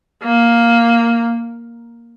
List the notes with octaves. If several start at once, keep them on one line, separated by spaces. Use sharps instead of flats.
A#3